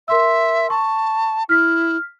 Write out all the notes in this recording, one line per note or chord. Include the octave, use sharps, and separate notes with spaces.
A#4 E5 C6 E6
A5 C#6
E4 F6 B6